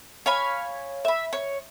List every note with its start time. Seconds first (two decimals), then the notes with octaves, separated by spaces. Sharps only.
0.26 C#5 F5 G#5 B5
1.05 E5 B5
1.33 C#5